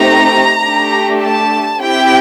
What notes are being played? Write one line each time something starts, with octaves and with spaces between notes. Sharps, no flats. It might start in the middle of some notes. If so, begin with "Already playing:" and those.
Already playing: A3 C4 D#4 G4 A#5
A3 D4 G4
A5
C4 E4 G4 G5